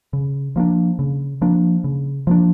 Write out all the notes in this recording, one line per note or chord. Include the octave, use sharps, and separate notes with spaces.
C#3
F3 A#3 D4
C#3
F3 A#3 D4
C#3
F3 A#3 D4